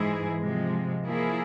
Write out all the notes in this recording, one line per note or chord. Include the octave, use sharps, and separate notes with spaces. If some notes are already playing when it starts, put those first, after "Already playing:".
Already playing: G#2 E3 G#3 E4 G#4
C3 F3 G#3
F3 A#3 E4 G#4